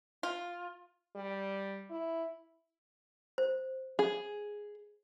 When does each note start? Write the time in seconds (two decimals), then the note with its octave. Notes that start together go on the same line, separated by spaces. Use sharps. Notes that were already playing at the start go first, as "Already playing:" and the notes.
0.23 F4
1.15 G3
1.90 E4
3.38 C5
3.99 G#4